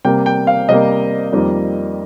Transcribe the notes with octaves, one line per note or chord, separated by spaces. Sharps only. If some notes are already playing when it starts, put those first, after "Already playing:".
C3 G3 A#3 G5
G5
F5
C3 G3 A#3 D#5
F2 D#3 G3 A#3